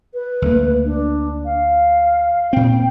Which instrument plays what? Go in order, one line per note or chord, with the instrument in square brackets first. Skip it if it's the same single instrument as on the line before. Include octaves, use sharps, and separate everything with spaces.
[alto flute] B4
[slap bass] D2 A3 A#3
[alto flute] D4
F5
[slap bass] A#2 C4 [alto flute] G5